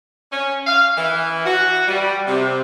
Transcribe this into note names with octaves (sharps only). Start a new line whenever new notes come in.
C#4
F5
E3
F#4
G3
C3